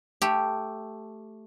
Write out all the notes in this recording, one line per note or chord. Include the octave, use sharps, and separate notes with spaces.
A3 G4